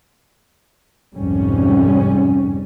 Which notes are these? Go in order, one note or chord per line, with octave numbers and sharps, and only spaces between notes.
C2 F2 G#2 G3 C#4